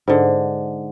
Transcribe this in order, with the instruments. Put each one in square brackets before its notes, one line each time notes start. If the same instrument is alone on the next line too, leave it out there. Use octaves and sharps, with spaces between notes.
[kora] G#2 D3